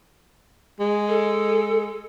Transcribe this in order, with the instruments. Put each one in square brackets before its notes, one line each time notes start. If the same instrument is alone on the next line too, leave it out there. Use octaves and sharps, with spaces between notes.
[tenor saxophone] G#3
[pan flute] A4